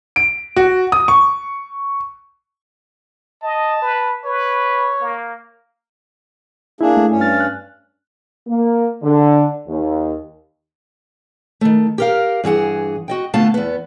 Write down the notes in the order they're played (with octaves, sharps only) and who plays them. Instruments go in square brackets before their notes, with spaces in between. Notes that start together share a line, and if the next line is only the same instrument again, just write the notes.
[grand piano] D7
F#4
D#6
C#6
[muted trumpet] D#5 [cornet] A5
[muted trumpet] B4
[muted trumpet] B4 [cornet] C#5
[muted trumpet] A#3
[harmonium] A#3 D4 G#4 [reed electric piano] E4
[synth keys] A3
[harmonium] G2 C#4
[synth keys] F6 A6
[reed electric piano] F#6
[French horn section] A#3
D3
D#2
[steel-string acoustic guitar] D#3 A3
G4 A#4 F5
G2 E3 G#4 F#5
F#4 D#5 G5
D3 A3 B3 F4 F5 A5
E2 B3